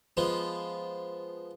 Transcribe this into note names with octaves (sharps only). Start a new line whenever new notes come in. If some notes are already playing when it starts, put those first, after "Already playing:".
F3 G#3 B3